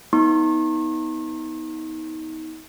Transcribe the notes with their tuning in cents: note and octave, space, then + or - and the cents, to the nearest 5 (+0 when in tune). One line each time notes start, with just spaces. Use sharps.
B3 +0 D#4 +30 C#6 -40